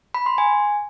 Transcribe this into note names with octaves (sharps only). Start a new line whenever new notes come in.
B5
C6
G#5